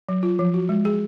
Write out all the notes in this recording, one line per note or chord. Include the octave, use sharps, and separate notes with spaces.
F#3
F4
F3
F#4
G#3
G#4